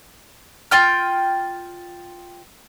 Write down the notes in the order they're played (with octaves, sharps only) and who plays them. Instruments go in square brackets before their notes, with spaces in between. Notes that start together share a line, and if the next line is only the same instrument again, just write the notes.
[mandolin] F4 G5 F6